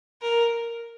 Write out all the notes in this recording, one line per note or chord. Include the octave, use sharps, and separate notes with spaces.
A#4